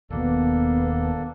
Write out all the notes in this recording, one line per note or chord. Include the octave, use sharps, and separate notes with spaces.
D#1 D#2 B2 A#3 B3 D4 A4